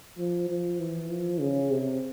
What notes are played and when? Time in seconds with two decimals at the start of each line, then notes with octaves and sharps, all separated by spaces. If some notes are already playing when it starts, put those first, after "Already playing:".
0.18 F3
0.49 F3
0.79 E3
1.10 F3
1.40 C#3
1.71 C3